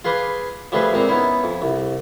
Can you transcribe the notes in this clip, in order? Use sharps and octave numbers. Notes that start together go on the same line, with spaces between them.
F4 G#4 B4 C6 D6 D#6
F3 G3 A3 D4 G#4 B4
A#2 G#3 C4 A#5
B3 C#4 D#4 E4
F2
C2